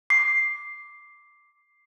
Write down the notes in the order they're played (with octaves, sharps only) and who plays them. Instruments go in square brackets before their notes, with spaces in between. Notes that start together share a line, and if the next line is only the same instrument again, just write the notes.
[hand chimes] D6 C7